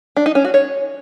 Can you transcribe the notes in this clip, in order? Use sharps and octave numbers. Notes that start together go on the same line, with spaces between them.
D4
D#4
C#4
F#4
C#5